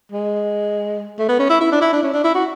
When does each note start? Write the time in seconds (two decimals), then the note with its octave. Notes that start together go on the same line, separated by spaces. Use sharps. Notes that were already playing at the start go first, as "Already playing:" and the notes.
0.12 G#3
1.19 A3
1.29 B3
1.39 C#4
1.49 E4
1.61 E4
1.72 D4
1.81 E4
1.93 D4
2.03 C#4
2.14 D4
2.24 E4
2.35 F#4